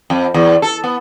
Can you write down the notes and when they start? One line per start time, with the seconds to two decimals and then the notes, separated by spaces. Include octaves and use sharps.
0.10 F2
0.34 E2
0.62 A4
0.84 B3